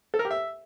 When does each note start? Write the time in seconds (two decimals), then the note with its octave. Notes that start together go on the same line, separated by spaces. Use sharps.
0.14 A4
0.19 A#4
0.25 G4
0.31 E5